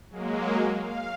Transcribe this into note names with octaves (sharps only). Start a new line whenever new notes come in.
F#3 G#3 A#3
F5